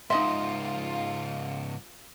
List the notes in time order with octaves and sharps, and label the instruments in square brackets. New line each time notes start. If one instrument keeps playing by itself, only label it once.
[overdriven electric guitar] C#2 G#2 [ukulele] D#4 D#5 E5 [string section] F4 [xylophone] C6